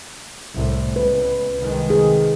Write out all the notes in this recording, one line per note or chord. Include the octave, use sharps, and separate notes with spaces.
C2 A2
C#2 B4
C2 D#3 G#3
G#4